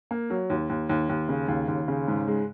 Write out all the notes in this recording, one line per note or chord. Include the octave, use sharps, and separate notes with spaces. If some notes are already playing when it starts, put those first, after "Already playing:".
A#3
F#3
D#2
D#2
D#2
D#2
C#3
D#2
D#2
C#3
G#2
G#3